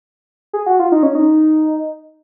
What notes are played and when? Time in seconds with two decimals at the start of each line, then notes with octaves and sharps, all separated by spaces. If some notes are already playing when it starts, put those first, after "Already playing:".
0.53 G#4
0.66 F#4
0.79 F4
0.92 D#4
1.03 C#4
1.15 D#4